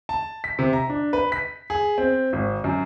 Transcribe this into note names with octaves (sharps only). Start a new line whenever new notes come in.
A5
B6
C3
A#5
D4
B4
B6
G#4
C4
G#1
F#2